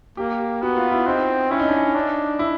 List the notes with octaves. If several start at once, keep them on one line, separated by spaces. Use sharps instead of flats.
A#3 G4
B3 F#4
F4
E4
C4 D#4
C#4 E4
D#4
D4
D#4
D4
E4